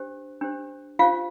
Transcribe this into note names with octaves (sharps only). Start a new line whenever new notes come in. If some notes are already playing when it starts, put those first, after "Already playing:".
Already playing: D4 G4 C5
D4 G4 C5
D4 F4 G4 C5 F5